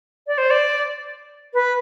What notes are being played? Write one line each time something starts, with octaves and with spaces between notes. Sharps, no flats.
D5
C5
D5
B4